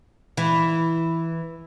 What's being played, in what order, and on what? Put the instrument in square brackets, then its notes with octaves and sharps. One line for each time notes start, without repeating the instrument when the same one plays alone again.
[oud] E3